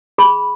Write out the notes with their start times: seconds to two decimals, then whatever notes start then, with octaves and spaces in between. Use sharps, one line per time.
0.18 G#4 B5